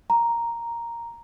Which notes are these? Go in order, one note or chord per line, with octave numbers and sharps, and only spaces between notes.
A#5